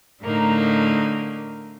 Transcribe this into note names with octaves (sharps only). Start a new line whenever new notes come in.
A2 D3 A3 A#3 D#4